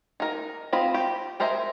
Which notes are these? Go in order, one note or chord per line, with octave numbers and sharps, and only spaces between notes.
D#4 A#4
C4 F4 D#5 B5
G4
G#4 A#4 C5 D#5 E5